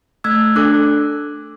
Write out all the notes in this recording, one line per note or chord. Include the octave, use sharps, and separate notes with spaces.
A3 E6 G#6
D4 A4 D6 F#6